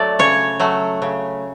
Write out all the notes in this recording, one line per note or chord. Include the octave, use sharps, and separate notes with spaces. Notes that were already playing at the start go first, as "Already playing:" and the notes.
Already playing: F#3 A3 D5
C#3 C#5
F#3 A3
C#3